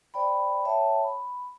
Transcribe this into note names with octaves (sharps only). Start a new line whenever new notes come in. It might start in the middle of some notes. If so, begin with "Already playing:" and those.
C5 D5 G5 B5
C#5 E5 G5 A5
B5